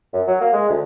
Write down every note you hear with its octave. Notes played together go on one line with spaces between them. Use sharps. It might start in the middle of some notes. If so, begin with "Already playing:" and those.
F#2
F#3
A#3
G#3
D2